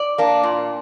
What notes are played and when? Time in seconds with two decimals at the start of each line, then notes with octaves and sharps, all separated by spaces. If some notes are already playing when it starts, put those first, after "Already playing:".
Already playing: D5
0.18 A#3 D4
0.43 A#2